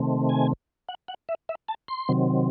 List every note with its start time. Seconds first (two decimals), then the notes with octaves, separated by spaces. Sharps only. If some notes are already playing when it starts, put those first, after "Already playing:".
Already playing: C3 D#3 A3 C4
0.29 G#5
0.89 F#5
1.08 F#5
1.29 E5
1.49 E5
1.68 A5
1.88 C6
2.09 C3 D#3 F#3 C4